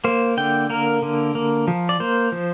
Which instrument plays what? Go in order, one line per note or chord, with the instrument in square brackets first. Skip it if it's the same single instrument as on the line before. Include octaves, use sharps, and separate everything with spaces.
[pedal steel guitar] A#3 C5
D3 G5
A#3 A#4
D3
A#3
F3
D5
A#3 C5
F3